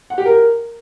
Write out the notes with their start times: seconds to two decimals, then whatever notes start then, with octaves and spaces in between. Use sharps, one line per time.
0.10 F#5
0.18 G4
0.25 A#4